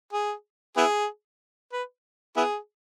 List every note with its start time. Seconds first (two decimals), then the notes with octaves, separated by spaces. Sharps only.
0.13 G#4
0.77 B3 E4 G#4
1.73 B4
2.37 B3 E4 G#4